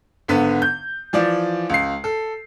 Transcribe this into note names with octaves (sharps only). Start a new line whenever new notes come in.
G#1 D3 B3
G6
E3 F3 D5
C#2 C7
A4